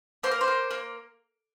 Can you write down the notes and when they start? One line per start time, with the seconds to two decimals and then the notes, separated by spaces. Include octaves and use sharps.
0.23 A#3 C5
0.31 A#4
0.41 C5
0.48 A#3
0.71 A#3